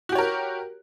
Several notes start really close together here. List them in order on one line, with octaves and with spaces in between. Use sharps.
F#4 G4 C#5 A#4